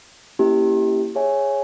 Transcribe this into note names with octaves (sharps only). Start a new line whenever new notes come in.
A#3 C#4 E4 G4
G#4 C#5 E5 G#5